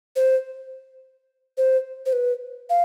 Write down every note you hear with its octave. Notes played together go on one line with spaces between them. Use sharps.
C5
C5
C5
B4
F5